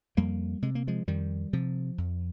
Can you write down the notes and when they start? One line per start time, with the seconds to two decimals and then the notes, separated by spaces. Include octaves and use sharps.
0.17 F2 G3 A#3
0.62 C3 G#3
0.75 A#3
0.87 F3 G#3
1.07 F2 D#3 G3
1.53 C3 F3
1.98 F2